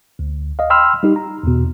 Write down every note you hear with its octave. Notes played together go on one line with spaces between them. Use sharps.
D2
D#5 F5
G5 B5 C6 E6 F6
G3 D#4 G4
A#5
E2 B2